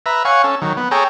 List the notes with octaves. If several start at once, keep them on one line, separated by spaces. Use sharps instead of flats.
B4 E5 A#5
C#5 F5 F#5 G#5 C#6
C#4 A4
D#3 F#3
B3
G#4 A4 C#5 G5 A#5